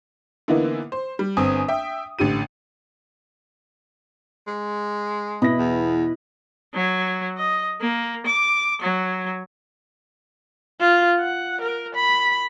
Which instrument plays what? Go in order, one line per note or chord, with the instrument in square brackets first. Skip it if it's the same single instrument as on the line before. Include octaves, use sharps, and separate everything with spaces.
[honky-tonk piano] D3 E3 A#3 B3 D#4 E4
C5
G3
G1 C4 G#5 D#6
E5 G5
A1 D3 G4 D#7
[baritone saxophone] G#3
[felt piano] B2 A#6 [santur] E4 B4 D#5
[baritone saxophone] E2
[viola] F#3
D#5
A#3
D6
F#3
[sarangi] F4
F#5
A#4
B5